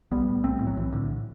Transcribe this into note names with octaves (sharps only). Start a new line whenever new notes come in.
B1 G3 B3
A2
B1 A3 C4
A2
F#3
B1 E3
A2 D3